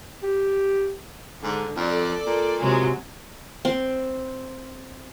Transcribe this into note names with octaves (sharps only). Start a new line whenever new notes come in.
G4
G#2 D3
F2 A4 D5
A#2
C3 F#3 G#3
C4